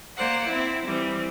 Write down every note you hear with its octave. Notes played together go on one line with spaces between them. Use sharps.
A#3 C5 D5 F#5
C4 E4
E3 G3 C4